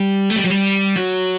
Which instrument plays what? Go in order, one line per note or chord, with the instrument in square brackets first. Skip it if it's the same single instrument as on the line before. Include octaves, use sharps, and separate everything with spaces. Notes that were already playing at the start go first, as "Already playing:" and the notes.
Already playing: [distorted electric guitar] G3
A3
G3
F#3
G3
F#3